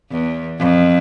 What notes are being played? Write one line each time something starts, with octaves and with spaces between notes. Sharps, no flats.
E2
F2